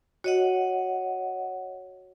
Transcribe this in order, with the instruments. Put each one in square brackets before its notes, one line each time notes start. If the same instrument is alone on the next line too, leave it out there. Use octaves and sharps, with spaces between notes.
[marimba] F#4 [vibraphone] C#5 D#5 F#5